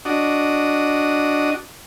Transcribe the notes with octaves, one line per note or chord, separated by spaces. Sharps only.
D4 F#4 D#5